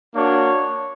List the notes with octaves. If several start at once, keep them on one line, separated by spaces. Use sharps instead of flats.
A#3 D4 F#4 C#5